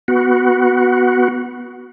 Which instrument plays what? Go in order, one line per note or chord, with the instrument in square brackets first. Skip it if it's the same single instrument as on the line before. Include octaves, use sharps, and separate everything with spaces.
[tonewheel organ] B3 F#4